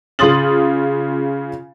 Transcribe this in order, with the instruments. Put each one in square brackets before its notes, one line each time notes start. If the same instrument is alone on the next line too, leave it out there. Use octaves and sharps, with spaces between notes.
[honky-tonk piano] C#3 F4 C6 D#6 A6 F#7